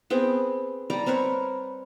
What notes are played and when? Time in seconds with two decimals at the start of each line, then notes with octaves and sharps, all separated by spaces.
0.10 B3 C4 G#4 G5
0.90 G3 D5 G5 A#5
1.06 C4 A#4 B4 C#5